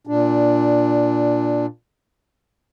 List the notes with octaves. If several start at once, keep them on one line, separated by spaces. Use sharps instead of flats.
A#2 D4